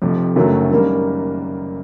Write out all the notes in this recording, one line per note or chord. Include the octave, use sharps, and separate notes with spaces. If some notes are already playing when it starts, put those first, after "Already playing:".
F1 F2 C3 F3
F#1 F#2 D#3 F#3 A3
F#2 D#3 G3 A#3